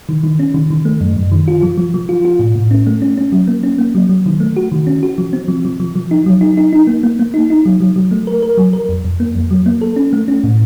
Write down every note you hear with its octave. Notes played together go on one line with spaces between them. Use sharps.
D#3
D#3
C#4
D#3
D#3
A3
F#2
F#2
D#3
F4
F3
F3
F3
F4
F4
A2
A2
C#4
A3
C#4
C#4
F#3
A#3
C#4
A#3
F#3
F#3
D#3
A3
F#4
D#3
C#4
F#4
F3
C4
F3
F3
F3
F3
D#4
F#3
D#4
D#4
D#4
A#3
A#3
A#3
D#4
D#4
F#3
F#3
F#3
A3
A#4
A#4
F#3
A#4
F2
F2
A#3
F2
F#3
A#3
A4
C#4
A3
C#4
A2